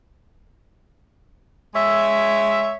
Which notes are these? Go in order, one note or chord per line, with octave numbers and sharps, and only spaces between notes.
G#3 C#5 E5